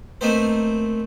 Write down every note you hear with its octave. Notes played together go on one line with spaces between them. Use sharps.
A3 A#3 C4 D#4 B4 C5